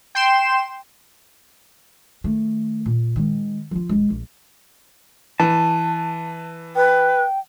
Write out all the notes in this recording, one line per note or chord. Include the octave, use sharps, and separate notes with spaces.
G5 C6 E7
D#3 A3
A#2
D#3 G#3
F3 F4
D#1 G#3
A#1
E3 A5
B4 G5